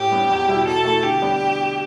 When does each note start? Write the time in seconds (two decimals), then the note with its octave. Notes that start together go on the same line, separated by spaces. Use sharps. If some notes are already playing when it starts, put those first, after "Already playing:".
Already playing: A2 G4
0.12 G3 B3 D4
0.30 E2
0.48 B2 G3 E4
0.67 B2 A4
0.85 A3 E4
1.03 D3 G4
1.22 G3 B3 D4